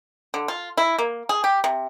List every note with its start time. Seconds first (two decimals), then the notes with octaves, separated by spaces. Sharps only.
0.34 D3
0.48 F4
0.77 E4
0.98 A#3
1.29 G#4
1.44 G4
1.64 C3